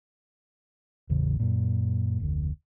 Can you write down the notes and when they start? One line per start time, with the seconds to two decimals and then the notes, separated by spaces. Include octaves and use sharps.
1.10 A1 E2 C#3
1.40 F#2 A#2
2.20 F1 D2